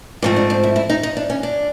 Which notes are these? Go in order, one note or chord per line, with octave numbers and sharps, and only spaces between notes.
G#2 F3 A3 C4 D4
D4
D4
E4
E4
D#4
D#4
D4
C#4
D4